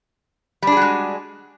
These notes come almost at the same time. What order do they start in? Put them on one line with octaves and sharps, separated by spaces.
G3 D4 G#4 F#4 G#3